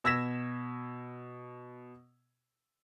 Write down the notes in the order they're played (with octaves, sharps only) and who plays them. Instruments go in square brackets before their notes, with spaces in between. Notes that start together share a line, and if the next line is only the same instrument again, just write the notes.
[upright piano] B2 E6 G#6 A#6 B6 E7